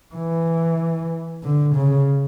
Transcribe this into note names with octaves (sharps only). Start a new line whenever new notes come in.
E3
D3
C#3